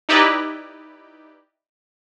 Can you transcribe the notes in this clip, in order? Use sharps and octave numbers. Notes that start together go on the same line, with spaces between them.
D#4 E4 G4 B4 D5 D#5